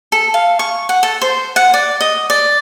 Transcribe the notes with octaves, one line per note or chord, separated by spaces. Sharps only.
A4
F5
C#6
F#5
A4
C5
F#5
D5
D#5
D5